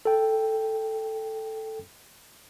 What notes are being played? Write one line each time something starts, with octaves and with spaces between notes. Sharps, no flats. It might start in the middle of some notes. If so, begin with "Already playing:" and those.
A4 G5